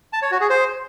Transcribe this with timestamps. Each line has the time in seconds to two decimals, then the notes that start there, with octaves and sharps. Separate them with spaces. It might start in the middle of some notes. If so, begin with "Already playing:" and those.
0.13 A5
0.22 C#5
0.31 F#4
0.41 G#4
0.50 C5